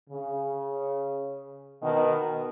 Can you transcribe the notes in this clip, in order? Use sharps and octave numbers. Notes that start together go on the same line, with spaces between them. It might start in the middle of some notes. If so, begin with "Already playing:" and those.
C#3
B2 D#3